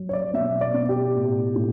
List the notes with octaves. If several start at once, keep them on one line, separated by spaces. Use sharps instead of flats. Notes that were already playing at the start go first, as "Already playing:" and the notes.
Already playing: F#3
C#5
D5
B2 E5
D5
B2
G4
A2
A2